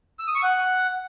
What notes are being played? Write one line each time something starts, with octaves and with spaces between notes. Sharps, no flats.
E6
D#6
C#6
F#5